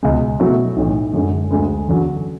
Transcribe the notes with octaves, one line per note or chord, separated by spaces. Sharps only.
C#2 B2 G#3
B2 F#3 A3 E4 A4
B1 A2 E3
F#2 D3 G#3
D2 D3 G#3
E2 D3 F#3 C#4